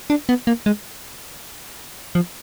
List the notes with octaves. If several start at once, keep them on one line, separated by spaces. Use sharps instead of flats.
D4
B3
A#3
G#3
F3